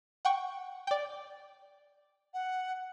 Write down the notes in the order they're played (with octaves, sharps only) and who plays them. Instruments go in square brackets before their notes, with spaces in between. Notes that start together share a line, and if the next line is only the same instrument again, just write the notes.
[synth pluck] F#5 G5 C#6
D5 G5
[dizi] F#5